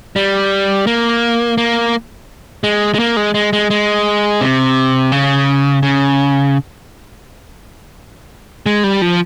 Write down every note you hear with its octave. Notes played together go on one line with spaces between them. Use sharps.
G3
A#3
A#3
G#3
G#3
A#3
G#3
G#3
G#3
G#3
C3
C#3
C#3
G#3
G3
F3